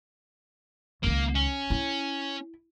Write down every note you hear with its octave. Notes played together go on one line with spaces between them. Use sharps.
C#2 D#3 A#3
C#4
E4